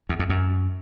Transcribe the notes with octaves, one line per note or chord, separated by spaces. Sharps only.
E2
F2
F#2